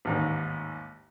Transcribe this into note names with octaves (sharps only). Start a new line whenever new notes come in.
A1 D#2 G#2